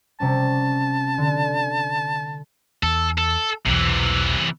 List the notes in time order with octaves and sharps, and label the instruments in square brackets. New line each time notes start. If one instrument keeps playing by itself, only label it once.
[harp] C3 G3 C#4 [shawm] A5
[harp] D3
[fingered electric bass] E2 [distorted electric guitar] A4
[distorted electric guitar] A4
[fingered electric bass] B1 E2 [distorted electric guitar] C3 E3